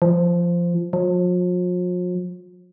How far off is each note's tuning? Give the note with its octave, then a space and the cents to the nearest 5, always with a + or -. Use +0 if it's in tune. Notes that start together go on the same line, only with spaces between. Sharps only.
F3 -10
F3 +45